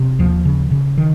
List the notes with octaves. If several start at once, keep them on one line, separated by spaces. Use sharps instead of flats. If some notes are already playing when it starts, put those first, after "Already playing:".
Already playing: C3
D#2 F3
C#3
C#3
D#3